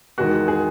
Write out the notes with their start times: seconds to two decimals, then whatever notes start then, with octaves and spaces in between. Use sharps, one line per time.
0.18 E2 D#3 G#3 F#4
0.48 G#4